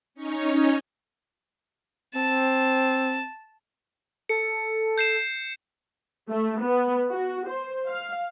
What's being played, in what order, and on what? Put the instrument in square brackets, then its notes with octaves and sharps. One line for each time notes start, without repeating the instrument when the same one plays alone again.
[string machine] C#4 D#4 C#5
[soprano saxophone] C4 [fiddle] A5
[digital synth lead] A4 [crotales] C#7
[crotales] G6 C7 E7
[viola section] A3
B3
F#4
C5
F5